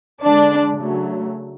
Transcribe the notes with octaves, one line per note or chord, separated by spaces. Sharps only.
D3 G#3 D4 D5
C#3 F#3 A3